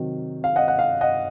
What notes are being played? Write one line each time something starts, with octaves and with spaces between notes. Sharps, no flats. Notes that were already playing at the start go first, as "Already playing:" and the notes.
Already playing: C3 D#3 F#3
F5
D#5 F#5
F#5
F5
D#5 F#5